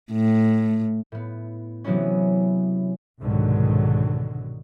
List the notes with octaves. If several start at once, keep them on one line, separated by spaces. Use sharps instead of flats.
A2
A2 B3
C3 E3 F#3 G#3 B3 C#4
C2 G#2 B2 D3 D#3 F#3